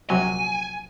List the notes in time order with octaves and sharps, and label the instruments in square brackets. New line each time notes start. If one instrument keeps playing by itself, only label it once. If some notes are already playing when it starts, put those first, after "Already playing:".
[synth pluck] A#1 C3 F#3 [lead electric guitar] G#5